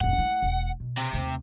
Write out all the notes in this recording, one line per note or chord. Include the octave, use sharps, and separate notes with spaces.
F1 A2 F#5
A3 E4
E1
B2
C3
D#2 A3